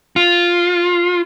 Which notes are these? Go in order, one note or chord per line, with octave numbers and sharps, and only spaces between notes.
F4